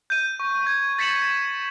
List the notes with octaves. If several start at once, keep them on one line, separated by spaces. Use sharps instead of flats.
G6 D#7
C#6
G#6
A6 B6 C#7 E7 F#7